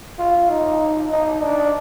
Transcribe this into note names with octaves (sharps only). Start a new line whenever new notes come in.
F4
D#4
D#4
D4